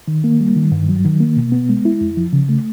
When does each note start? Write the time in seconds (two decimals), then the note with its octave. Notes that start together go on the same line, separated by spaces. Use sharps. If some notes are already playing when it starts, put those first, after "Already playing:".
0.08 D#3
0.24 A#3
0.40 G3
0.56 D#3
0.72 G2
0.89 F#3
1.05 D#3
1.20 A#3
1.37 B2
1.52 B3
1.69 G#3
1.85 E4
2.01 F2
2.17 F3
2.33 C#3
2.49 A3